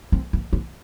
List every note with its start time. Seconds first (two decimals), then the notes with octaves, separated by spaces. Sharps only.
0.12 C4
0.33 B3
0.53 B3